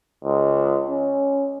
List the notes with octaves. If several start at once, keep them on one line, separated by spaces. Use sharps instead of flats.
C#2
C#4